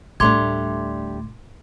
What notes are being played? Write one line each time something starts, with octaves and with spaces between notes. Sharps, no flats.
D2 A2 G3 A3 D4 C6 D6 G#6